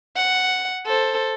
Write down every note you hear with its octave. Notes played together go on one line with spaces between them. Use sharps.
F#5
A4 C5